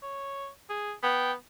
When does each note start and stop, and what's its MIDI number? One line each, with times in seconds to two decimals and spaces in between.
0.02 0.48 73
0.70 0.93 68
1.03 1.34 59
1.03 1.32 79